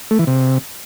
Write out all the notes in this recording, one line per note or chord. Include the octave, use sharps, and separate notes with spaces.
A3
E3
C3